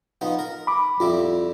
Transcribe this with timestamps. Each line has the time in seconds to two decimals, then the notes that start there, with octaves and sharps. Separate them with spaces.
0.21 F3 B3 D#4
0.39 A#4
0.67 B5 D6
1.00 F2 G3 E4 F4